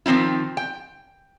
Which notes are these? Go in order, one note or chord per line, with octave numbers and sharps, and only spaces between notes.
D#3 F3 C4 D#4 E4
G5